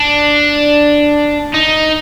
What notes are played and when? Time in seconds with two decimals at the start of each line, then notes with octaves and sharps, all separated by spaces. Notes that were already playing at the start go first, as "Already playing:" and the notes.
Already playing: D4
1.54 D#4